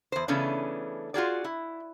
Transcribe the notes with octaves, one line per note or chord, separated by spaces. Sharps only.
E2 C5
C#3 E3 A3 B3 C#4 D4
F4 F#4 G#4 D5
E4